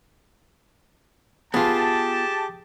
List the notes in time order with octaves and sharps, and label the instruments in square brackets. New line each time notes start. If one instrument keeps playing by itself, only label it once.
[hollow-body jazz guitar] B3 F4 [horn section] G4 A5 [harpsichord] G#4